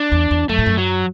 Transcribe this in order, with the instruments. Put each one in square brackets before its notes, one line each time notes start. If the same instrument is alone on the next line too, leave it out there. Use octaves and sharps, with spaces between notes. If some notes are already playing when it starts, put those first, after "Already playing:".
Already playing: [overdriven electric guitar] D4
[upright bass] E2
E2
[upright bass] F#2 [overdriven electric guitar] A3
[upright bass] A2
F#2
[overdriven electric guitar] F#3